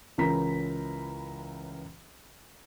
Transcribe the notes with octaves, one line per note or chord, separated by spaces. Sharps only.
C#2 E3 C#4 A#4 A#5 B6